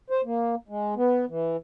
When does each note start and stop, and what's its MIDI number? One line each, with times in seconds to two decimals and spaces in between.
0.10 0.21 72
0.25 0.55 58
0.69 0.94 56
0.96 1.25 59
1.29 1.57 52